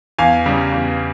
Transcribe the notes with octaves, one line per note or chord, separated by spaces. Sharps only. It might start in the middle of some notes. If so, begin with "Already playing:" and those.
E2 F5 G#5
C#3 G3
E2